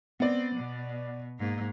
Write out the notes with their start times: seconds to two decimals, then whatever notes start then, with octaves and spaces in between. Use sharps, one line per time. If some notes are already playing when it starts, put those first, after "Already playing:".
0.20 B3 C4 D5
0.56 B2
1.39 G#2 A#3